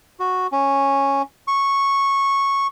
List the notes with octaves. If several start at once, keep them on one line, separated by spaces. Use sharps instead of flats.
F#4
C#4
C#6